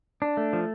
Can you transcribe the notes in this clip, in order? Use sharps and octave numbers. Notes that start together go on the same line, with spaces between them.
D4
A3
F3